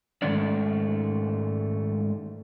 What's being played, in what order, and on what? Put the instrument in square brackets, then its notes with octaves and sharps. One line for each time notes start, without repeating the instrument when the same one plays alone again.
[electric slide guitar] G#2 D#3 G#3 A3 C#4 D5